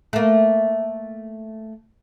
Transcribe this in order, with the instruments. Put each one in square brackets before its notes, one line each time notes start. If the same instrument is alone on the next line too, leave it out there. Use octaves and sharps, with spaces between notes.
[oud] A3 A#3